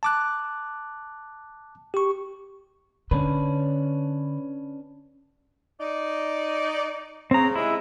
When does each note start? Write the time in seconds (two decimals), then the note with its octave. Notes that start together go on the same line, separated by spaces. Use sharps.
0.03 A5 D6 F#6
1.94 G4 C#6
3.11 D3 C#4 D4 B4
5.80 D#4 D5
7.31 C#3 C4 A#5
7.55 G#2 C3 G#3 E4